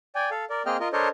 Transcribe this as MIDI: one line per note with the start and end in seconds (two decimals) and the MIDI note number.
0.15 0.30 74
0.15 0.30 79
0.15 0.30 80
0.31 0.45 69
0.31 0.45 77
0.50 0.62 70
0.50 0.62 74
0.66 0.77 58
0.66 0.77 60
0.66 0.77 68
0.66 0.77 75
0.66 0.77 79
0.66 0.77 89
0.80 0.88 65
0.80 0.88 70
0.80 0.88 75
0.93 1.08 62
0.93 1.08 69
0.93 1.08 70
0.93 1.08 72
0.93 1.08 73
0.93 1.08 75